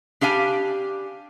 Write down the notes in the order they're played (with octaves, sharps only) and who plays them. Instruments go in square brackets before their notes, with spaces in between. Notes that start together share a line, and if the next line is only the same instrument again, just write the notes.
[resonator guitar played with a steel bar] D4 G4 F5 G#5